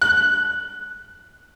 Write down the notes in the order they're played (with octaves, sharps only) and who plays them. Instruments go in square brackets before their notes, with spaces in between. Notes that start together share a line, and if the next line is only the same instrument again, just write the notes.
[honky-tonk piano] F#6